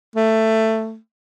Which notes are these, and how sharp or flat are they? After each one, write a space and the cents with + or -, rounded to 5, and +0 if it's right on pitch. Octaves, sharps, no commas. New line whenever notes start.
A3 +10